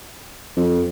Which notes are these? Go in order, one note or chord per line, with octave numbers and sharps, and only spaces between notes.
F2